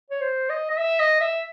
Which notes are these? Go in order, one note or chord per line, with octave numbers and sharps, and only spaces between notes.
C#5
C5
D#5
D#5
E5
D#5
E5